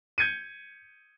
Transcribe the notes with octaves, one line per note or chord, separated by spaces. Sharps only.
G6 G#6 C#7 D#7